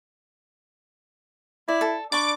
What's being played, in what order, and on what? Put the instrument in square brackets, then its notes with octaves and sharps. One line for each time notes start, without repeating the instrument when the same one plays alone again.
[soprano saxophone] E4 [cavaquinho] D5
[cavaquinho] A4
[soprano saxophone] D4 [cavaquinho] D5 B5 C#6 [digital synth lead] D6